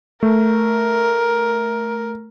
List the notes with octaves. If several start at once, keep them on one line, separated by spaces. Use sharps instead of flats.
A3 A#4